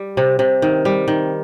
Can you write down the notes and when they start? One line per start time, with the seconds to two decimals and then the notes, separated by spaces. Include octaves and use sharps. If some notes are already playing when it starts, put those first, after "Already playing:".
Already playing: G3
0.17 C3
0.39 C3
0.62 D#3
0.85 G3
1.08 D#3